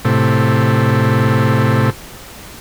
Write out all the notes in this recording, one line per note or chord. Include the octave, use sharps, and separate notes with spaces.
A2 C3